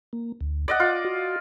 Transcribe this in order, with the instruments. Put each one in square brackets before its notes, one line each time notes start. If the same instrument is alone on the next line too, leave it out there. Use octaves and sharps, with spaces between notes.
[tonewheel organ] A#3
D2
[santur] D5 D#5 F#5
[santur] F4 [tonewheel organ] D6
[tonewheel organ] F#4